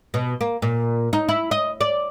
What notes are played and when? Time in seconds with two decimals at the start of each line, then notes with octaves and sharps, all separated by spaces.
0.14 B2
0.41 A#3
0.62 A#2
1.13 D#4
1.29 E4
1.51 D#5
1.81 D5